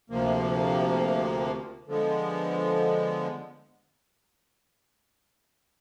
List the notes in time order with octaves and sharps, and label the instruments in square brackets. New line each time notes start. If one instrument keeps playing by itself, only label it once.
[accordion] D2 C3 F3 A#3
D3 F3 G#3 B3